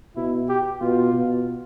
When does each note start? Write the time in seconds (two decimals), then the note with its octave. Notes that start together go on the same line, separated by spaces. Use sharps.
0.16 B2 E4
0.49 G4
0.80 B2 F4
1.13 B2